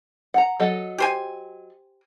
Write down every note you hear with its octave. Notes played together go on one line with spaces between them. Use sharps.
F#5 A#5
F#3 A4 D#5
G4 C5 G#5